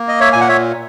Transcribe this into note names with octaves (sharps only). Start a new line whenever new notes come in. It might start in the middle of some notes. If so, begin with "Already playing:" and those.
Already playing: A#3
D#5
C#5 E5
A#2 G#5
F#5
C#5 E5